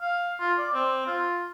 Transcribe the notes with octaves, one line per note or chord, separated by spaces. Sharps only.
F5
F4
D5
C4
F4